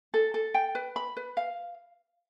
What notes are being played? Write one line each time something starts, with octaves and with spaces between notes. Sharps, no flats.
A4
A4
G5
B4
B5
B4
F5